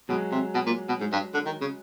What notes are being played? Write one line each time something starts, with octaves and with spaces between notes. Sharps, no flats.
B2 F#3 G#3
C3
B2
A#2
B2
G#2
G2
D3
D#3
C#3